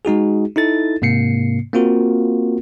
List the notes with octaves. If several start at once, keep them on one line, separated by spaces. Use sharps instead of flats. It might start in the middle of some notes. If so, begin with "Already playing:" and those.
G#3 D#4 F#4 G#4
D#4 E4 A4 A6
G#2 C3 A#3 C7 C#7
A#3 C4 F4 F#4 A#4